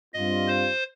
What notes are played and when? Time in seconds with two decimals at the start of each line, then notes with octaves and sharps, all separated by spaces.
0.13 G2 G3 C4 F4 D#5
0.48 C5